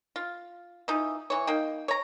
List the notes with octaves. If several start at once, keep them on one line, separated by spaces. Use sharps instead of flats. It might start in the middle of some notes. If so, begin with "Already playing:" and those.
F4
E3 F3 D#4
E3 C#5
A#3 D#4 G5
C#5 A#5